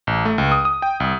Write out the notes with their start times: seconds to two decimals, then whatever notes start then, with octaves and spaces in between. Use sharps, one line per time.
0.07 A1
0.25 A3
0.38 C#2
0.52 D#6
0.65 D#6
0.82 G5
1.00 C2